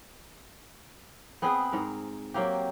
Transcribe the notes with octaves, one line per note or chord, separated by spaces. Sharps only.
B3 C4 G#4 B4
G#2 A#4
F#3 A#3 C4 G4